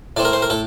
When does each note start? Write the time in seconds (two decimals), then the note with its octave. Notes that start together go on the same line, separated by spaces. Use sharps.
0.17 A2 A3 C4 D5
0.25 A#4
0.33 C5
0.42 A#4
0.50 A2 A4